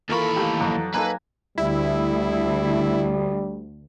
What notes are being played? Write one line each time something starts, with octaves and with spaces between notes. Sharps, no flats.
D#2 E3 F4 A4 A#4 B5 C#6
A3 A#3 G4
F2 F#3 A#5 F#6
A#3 D#4 A4 B4 G#5 A#5
D2 G3 E4